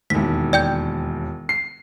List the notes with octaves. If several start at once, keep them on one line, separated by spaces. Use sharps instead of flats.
E1 D#2 B6
D5 G5 G6
C7